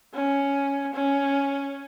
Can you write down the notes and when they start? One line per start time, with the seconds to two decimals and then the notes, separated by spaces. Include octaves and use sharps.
0.14 C#4
0.94 C#4